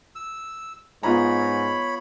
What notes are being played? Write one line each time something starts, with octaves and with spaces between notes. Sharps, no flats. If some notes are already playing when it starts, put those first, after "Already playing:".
E6
G#2 B3 F4 C#5 A#5 B5